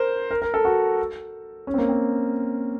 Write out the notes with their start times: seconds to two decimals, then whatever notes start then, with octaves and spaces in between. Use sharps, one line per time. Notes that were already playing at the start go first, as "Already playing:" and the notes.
Already playing: A#4 C5
0.31 A#4
0.42 A#4
0.54 A4
0.65 F#4
1.67 C#4
1.74 C4
1.78 A#3
1.89 C4